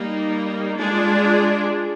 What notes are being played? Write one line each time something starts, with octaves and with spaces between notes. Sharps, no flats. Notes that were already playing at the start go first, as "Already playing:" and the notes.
Already playing: G3 A#3 D#4
G#3 D4 F4 G#4